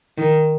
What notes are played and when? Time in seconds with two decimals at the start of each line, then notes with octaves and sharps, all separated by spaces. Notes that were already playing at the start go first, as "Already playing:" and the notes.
0.18 D#3